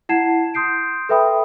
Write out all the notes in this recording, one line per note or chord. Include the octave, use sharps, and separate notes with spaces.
E4 F#5 A5 G#6 C7 E7
C6 D#6 G6 C7 D7
A4 B4 E5 G5 B5 D#6